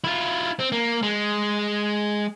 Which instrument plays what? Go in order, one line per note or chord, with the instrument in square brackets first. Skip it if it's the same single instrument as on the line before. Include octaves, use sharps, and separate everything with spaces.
[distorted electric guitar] E4 F4
C4
A#3
G#3